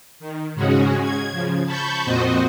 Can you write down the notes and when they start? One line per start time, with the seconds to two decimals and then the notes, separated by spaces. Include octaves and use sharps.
0.20 D#3
0.55 G#2 C#3 G#3 C#4 F#4 G#4
1.02 G#6
1.31 C#3 F3
1.65 A5 B5 C#6 G6
2.05 F2 A#2 C4 F#4 C5 D#5